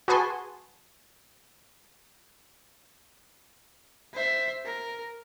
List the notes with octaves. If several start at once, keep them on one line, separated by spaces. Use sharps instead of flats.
F#4 G#4 B4 G#5 A5 C6
C5 E5
A#4